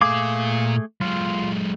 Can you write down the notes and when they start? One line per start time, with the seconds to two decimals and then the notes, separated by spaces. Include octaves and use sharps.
0.01 A#2 A3 G#4 F5 D6
1.01 F#3 G#3 F4